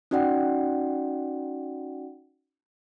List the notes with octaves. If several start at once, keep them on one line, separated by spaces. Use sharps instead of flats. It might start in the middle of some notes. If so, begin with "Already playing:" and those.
C#4 D#4 F#4 D5 F#5 G5